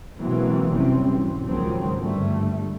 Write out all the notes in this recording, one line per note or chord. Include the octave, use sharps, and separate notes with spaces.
B2 E3 F#3 G#3 A#3 C4
F#1 C3 E3 G3 C4 C#4
B1 G#2
C#2 G#2 D#3 F3 F#3 C4
G2 D3 G3 A3